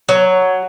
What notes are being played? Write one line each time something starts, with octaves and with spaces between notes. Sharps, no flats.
F#3